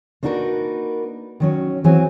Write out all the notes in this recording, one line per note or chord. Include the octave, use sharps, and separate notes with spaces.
A#3 D4 D#4 F#4 A#4 B4
D#3 F#3 C#4
E3 F#3 C4 G#4 G#5